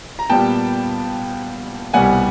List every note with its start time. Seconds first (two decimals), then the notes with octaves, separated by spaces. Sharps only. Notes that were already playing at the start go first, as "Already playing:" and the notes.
0.19 A#5
0.30 A#2 G3 B3 G5 A5
1.94 C2 B2 G3 B3 F#5 G#5